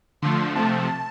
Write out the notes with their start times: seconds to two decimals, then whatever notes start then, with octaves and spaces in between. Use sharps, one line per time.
0.22 D3 F3 A3 C6
0.55 C3 F3 A3 A5